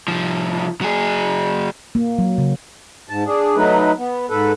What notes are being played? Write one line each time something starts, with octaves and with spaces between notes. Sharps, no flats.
C2 F3
F#3 G#4
A#3
F#3
C#3
G#2 A5
D4 G#4
F#3 A3 D#4 B4
B3
G#2 A4 B4